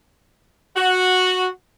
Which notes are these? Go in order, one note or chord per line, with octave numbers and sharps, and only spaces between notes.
F#4